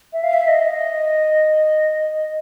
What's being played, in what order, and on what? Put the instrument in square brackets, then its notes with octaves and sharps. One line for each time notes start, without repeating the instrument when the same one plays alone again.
[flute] E5
F5
E5
D#5